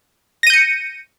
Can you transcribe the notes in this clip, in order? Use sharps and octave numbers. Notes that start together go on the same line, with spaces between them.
G6 A#6 C#7 D#7